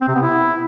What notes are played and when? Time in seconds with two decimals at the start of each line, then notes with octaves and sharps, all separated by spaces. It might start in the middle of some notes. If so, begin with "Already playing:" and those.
0.01 C4
0.08 C3
0.15 B3
0.22 E4